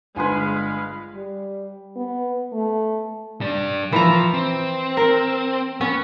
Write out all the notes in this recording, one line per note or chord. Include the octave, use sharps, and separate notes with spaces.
G1 G#3 B4 F5 G#5 C6
G3
B3
A3
G3 D4
E3 F3 A#5
C4
A#4
B3 C#4